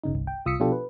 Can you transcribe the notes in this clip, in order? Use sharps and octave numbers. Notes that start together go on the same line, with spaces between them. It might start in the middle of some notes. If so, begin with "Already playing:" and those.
G1 C#3 D#4
G1 C2
G5
C2 F4 D#6 E6 B6 C#7
B2 F3 D4 F4 G4 A4
B4